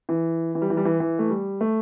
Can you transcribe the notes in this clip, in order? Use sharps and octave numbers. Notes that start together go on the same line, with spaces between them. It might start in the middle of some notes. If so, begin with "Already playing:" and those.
E3
E3
G3
E3
G3
E3
E3
A3
G3
A3